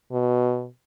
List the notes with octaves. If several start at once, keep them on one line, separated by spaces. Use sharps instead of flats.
B2